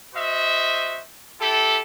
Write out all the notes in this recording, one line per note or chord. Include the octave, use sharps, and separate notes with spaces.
F#4 C5 D#5 E5
E4 G4 A4